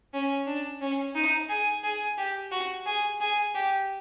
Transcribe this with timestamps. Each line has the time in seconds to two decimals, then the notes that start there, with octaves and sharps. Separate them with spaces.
0.13 C#4
0.47 D4
0.81 C#4
1.15 D#4
1.49 G#4
1.83 G#4
2.18 G4
2.51 F#4
2.86 G#4
3.21 G#4
3.54 G4